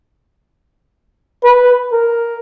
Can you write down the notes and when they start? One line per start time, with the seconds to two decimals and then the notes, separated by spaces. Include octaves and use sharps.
1.44 B4
1.92 A#4